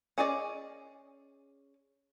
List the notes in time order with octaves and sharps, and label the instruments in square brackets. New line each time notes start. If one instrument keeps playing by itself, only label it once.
[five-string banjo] C#4 G#4 D5 D#5